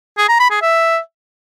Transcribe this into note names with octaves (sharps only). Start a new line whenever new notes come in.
G#4
A#5
B5
G#4
E5